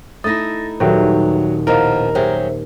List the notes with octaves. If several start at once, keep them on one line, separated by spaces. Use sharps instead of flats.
A3 D#4 E4 D#6 A6 A#6
D#1 F#3 G4 A4 B4 G5
B2 F3 E4 A#4 D#5 F5
F#3 G4 G#4 C5 E5